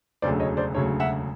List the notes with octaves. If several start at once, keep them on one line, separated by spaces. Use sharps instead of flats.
E1 D2 C#3 F#3 A3 C5 D5
C#5 D#5
C5 D5
E1 D2 C#3 F#3 A3 C#5
E5 F#5